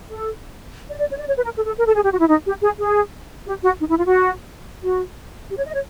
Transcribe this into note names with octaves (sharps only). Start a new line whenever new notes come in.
A4
D5
D5
C#5
D5
C#5
B4
A#4
A4
A4
A#4
A4
G#4
G4
F#4
E4
D#4
G4
G#4
G#4
G4
F#4
D#4
E4
F4
F#4
F#4
G4
C#5
D#5
C#5